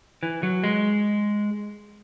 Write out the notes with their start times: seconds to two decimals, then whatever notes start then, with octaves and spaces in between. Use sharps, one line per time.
0.23 E3
0.43 F#3
0.64 G#3